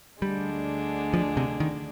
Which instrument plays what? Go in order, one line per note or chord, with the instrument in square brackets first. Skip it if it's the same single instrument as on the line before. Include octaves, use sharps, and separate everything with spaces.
[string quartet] D2 D3 G#3 D4 [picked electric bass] G3
[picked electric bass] F3
C3
D#3